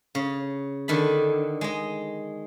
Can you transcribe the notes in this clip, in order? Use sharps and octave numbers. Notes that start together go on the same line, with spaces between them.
C#3
D3 D#3 A5 B5
G#3 D#5